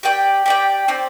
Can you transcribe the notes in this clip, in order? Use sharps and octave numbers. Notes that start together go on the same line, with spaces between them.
G4 D5 G5
G4 D5 G5
C4 G4 D5